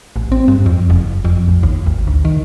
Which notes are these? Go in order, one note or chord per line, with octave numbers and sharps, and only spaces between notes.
A1
C4
G2
F2
F#1
F2
A1
D#2
G#1
D2
D#3